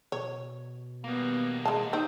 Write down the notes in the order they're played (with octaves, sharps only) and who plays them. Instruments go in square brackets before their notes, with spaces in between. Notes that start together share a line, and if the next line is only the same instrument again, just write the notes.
[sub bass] B2 [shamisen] C#5
[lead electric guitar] G3 A#3 [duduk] B3
[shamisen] G#3 A5
[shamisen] C4 [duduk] D#4